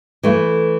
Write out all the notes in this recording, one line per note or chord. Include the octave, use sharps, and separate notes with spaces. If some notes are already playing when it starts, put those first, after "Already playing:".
E3 A3